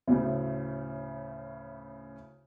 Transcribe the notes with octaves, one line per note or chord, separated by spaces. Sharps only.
D2 A2 C#3